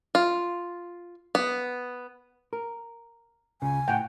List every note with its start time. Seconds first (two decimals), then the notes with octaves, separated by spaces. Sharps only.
0.15 F4
1.35 B3
2.53 A#4
3.62 C#2 C#3 G#5
3.88 A2 F#5 G5